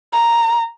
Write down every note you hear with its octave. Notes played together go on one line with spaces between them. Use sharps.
A#5